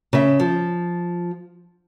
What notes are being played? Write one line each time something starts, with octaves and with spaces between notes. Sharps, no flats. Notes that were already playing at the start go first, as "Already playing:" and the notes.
C#3 E5
F3